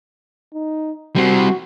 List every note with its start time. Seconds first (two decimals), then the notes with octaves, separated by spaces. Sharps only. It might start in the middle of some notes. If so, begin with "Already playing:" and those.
0.54 D#4
1.16 G3 C4 F#4